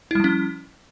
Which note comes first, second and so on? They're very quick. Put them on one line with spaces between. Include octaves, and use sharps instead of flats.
E4 G3 F3 C#4